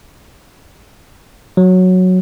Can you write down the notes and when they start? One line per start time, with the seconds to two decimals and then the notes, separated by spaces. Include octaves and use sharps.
1.57 F#3